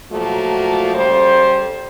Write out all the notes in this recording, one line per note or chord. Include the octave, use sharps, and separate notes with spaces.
A#2 F3 F#3 A3 A#3 F#4
C#3 G3 A4 C5